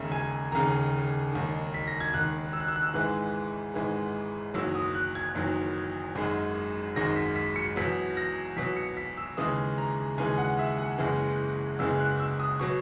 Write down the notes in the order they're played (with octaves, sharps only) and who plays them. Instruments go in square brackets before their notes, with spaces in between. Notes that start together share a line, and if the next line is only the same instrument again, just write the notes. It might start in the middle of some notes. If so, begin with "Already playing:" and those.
Already playing: [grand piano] E1 D#2 C#3 E5
G#5
E1 D#2 C#3 A#5
E1 D#2 D#3
B6
A#6
G#6
E1 D#2 D#3 F#6
E6
F#6
E6
F#6
E6
G#1 G#2 E3 G#3 F#6
G#1 G#2 E3 G#3
F#1 E2 D#3 F#3 E6
D#6
F#6
G#6
F#1 E2 D#3 F#3
G#1 F#2 D#3 G#3
G#1 F#2 D#3 G#3 A#6
B6
B6
C#7
E2 B2 F#3 B6
A#6
E2 B2 F#3 B6
C#7
B6
E6
D#2 C#3 E3 G#3 D#6
A#5
D#2 C#3 E3 G#3 G#5
F#5
E5
F#5
F#1 E2 C#3 E3 G#3
F#1 E2 C#3 E3 G#3 E6
F#6
E6
D#6
B2 F#3 C#6